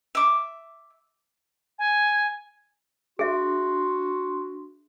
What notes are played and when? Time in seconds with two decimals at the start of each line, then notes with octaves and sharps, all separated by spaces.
0.15 E5 D6
1.79 G#5
3.19 D4 F#4 G#4 E5 C6